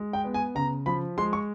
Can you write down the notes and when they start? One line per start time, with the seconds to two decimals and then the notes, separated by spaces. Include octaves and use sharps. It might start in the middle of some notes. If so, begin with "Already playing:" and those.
Already playing: G#3
0.13 G5
0.24 B3
0.34 G#5
0.55 C#3 A#5
0.86 F3 B5
1.18 G#3 C6
1.33 C#6